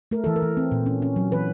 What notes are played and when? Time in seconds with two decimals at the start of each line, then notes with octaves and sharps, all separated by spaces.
0.11 A3 A#4
0.24 E3 A4
0.36 A#4
0.42 E3
0.57 C4
0.72 A#2
0.86 C#4
1.02 C#4
1.16 F#3
1.32 E3 B4